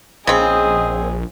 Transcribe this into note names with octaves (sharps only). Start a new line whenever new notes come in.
A#1 C#3 C4 G#4 D#5